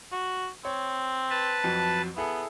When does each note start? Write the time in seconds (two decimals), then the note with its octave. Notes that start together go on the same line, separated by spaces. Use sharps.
0.12 F#4
0.65 C4 C#5
1.30 B4 A5
1.64 F2 F#3
2.16 B3 E4 G#4 A4